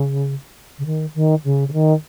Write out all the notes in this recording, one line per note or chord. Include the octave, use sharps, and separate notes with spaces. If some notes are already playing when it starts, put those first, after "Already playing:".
Already playing: C#3
C#3
D#3
D#3
C#3
C#3
D#3